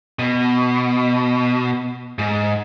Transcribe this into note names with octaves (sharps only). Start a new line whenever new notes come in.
B2
G#2